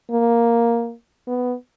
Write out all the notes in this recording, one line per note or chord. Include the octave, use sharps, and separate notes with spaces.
A#3
B3